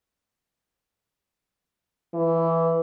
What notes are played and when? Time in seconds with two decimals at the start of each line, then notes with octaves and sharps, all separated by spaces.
2.14 E3